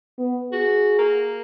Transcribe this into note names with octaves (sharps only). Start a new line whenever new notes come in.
B3
F#4 G#4
A#3